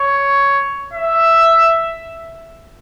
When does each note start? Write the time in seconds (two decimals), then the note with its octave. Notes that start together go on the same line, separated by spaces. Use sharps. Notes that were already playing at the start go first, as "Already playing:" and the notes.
Already playing: C#5
0.93 E5